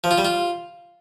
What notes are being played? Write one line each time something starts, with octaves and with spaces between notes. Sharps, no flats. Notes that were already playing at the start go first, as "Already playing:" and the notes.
F3
F4
G3
F4